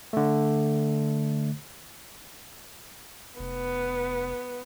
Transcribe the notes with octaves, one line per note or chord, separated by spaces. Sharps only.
D3 A3
F1 B3